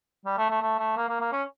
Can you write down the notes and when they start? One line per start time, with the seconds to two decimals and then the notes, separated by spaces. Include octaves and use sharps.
0.25 G3
0.38 A3
0.50 A3
0.61 A3
0.79 A3
0.96 A#3
1.09 A#3
1.20 A#3
1.32 C#4